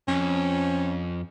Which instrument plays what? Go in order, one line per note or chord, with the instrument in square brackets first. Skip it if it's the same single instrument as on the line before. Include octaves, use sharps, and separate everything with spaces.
[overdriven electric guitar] F2 [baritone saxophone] C#4